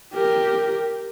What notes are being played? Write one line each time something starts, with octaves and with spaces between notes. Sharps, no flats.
G4 A#4